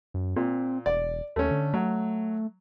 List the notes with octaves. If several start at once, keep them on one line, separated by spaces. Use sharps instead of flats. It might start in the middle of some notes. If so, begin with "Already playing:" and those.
F#2
A#2 C4
E1 D5
D#2 A3 C#4
D3
F#3 A3